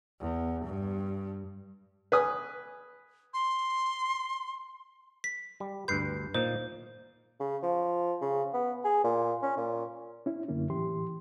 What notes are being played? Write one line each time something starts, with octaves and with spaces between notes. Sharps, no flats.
E2
G2
B4 G#5 D#6
C6
B6
G3
D2 G2 B4 G6 C7
A#2 A#3 D#4 C5
C#3
F3
C#3
B3
G#4
A#2
C#4
A#2
C#4 E4
F#2 D3 A#3 C#4 E4
A2 E3 G4 C6